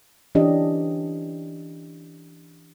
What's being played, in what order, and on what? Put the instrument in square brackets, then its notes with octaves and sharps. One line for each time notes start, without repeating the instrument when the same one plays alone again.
[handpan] E3 C#4 D4 G4 D#5